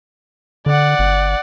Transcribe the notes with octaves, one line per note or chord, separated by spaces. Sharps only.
D3 D5 F#5
G1